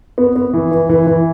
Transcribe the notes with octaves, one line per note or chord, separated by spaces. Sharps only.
B3
B3
E3
E3
E3
E3